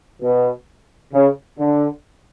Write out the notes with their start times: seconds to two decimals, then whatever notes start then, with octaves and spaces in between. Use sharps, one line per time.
0.21 B2
1.13 C#3
1.58 D3